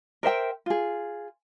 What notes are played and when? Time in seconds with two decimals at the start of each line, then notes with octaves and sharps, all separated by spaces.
0.23 A#4 C5 E5 G5
0.66 F4 G#4